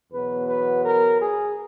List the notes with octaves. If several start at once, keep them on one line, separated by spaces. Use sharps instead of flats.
E2 B2 F#3 B3 B4
B4
A#4
G#4